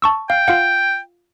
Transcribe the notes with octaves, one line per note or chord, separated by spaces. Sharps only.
A5 C#6 E6
F5 G5
F4 F5 F#5